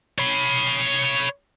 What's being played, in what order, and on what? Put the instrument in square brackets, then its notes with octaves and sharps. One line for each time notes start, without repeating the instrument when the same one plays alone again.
[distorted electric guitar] C#5 B5